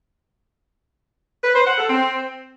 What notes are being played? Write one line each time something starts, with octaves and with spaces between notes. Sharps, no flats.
B4
C5
F#5
A4
C4